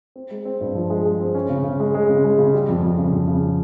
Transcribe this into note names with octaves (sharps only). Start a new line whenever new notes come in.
C4
G#3
C4
G2
F3
G#3
G#3
C4
C#4
C#3
C#3
G#3
G#3
C#3
G#3
C#3
G3
F2
F2
C#3
F2
C#3